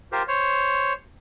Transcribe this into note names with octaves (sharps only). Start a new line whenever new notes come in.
F4 G4 A#4 C5
C5 C#5